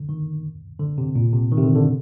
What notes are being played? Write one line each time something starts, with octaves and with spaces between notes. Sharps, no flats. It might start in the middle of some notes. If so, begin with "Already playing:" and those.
Already playing: D3
D#3
D3
C3
A#2
C3
D#3
C3
D3
D3